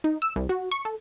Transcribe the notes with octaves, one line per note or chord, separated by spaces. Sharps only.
D#4
E6
C2
F#4
C#6
A4